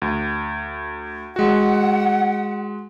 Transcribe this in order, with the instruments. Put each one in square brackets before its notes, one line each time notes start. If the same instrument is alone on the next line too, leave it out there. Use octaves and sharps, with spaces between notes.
[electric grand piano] D2
[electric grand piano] G#3 F#4 [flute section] F#5